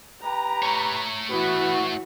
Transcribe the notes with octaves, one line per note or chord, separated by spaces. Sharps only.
G4 B4 A#5
A3 C#5
E3 B3 F#4 B4